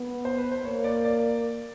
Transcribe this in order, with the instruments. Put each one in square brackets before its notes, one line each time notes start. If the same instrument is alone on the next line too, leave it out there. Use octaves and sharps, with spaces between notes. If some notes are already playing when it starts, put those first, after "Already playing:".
Already playing: [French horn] B3
[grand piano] C5
B4
C5
[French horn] A#3 [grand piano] C#5
[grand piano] D5
D5